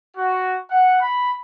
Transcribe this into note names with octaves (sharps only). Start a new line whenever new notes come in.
F#4
F#5
B5